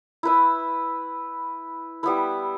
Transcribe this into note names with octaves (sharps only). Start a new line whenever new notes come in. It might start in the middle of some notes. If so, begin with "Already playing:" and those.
E4 B4 E5
G3 B3 E4 B4